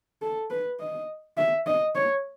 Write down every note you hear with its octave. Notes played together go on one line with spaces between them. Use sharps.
A4
B4
D#5
E5
D#5
C#5